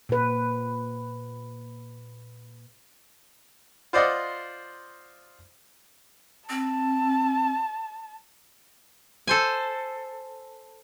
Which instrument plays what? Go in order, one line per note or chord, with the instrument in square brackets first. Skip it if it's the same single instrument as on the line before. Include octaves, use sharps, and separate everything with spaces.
[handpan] A#2 B4
[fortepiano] F4 C5 D5 D#5 F5 F#5
[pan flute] C4 [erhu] A5
[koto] A4 C5 G#5